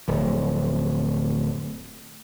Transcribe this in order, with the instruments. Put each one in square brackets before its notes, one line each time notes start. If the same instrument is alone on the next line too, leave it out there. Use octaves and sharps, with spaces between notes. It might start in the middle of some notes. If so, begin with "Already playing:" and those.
[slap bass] D1 F2